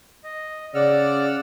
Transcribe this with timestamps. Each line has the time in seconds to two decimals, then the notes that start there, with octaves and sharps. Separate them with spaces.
0.24 D#5
0.75 C#3 D5 F#5 E6 F6